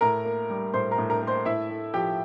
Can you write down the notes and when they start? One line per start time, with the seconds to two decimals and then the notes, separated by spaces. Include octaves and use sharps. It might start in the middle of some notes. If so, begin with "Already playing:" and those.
0.01 A2 A#4 A#5
0.25 A#3
0.50 G3
0.74 A2 C5 C6
0.91 A#4 A#5
0.98 A2
1.10 A#4 A#5
1.22 A#3
1.27 C5 C6
1.45 A2 E4 E5
1.70 A3
1.94 F3 G4 G5